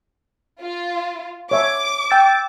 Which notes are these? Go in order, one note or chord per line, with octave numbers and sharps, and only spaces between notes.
F4
C#5 E5 D6
G5 E6 A6